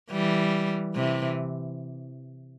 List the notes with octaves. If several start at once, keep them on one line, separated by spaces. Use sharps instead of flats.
E3 G3
C3 E3